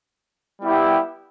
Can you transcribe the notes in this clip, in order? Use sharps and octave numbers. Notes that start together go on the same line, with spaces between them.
G3 B3 E4 G4